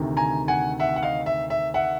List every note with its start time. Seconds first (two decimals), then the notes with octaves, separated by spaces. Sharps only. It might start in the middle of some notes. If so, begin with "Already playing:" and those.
Already playing: D2 C3 D#3
0.17 G#5 A#5
0.48 F#5 G#5
0.79 E5 F#5
0.96 F#5
1.03 D#5 F5
1.26 E5
1.50 E5
1.74 E5 F#5